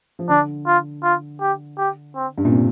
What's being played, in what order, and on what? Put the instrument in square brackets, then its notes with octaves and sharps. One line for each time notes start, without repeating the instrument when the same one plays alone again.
[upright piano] F3
[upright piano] D3 [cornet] D4
[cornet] F4
F4
G4
G4
C4
[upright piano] G2
A#2
C3